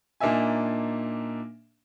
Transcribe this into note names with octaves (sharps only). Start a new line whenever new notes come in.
A#2 A#3 D4 D#4 E5 G#5